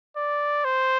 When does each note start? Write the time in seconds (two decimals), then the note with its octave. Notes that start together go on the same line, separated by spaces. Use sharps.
0.17 D5
0.65 C5